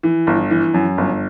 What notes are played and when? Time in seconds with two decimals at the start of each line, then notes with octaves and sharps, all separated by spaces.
0.03 E3
0.27 G1
0.51 E3
0.74 F#2
0.98 G1